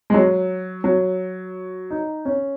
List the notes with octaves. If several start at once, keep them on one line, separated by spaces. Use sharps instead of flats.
G#3
F#3
F#3
D#4
C#4